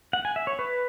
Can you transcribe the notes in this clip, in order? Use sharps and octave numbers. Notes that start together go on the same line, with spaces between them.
F#5
G#5
E5
C#5
B4